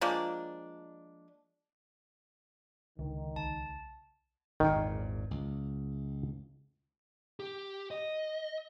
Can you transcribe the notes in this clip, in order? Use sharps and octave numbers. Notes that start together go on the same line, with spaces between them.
F3 G#3 A#3 D4
C#2 D3 D#3
B1 A5
G#1 E2 A#2 D#3
C#2
G4
D#5